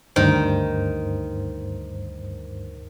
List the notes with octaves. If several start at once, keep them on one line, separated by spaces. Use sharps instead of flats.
D2 G2 D#3 C5